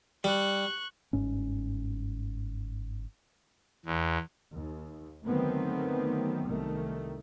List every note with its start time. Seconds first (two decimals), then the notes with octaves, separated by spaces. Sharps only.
0.24 G3 C#6 F#6
1.13 G1 G#2 C#4
3.85 E2
4.52 D#2
5.25 D3 D#3 F#3 A3 B3 C4
6.45 C2 D#3 A3